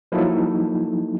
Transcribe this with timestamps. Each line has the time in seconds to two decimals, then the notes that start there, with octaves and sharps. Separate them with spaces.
0.12 F3 F#3 A#3 D#4 E4 A4